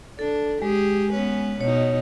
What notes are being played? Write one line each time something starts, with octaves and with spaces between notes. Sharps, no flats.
D4 A4
G#3 G4 G#4
B3 C#4 B4
B2 D#4 C#5